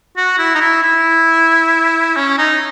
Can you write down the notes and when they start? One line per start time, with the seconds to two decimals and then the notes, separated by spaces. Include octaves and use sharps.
0.17 F#4
0.39 E4
0.55 D#4
0.61 E4
0.83 E4
2.17 C#4
2.38 D#4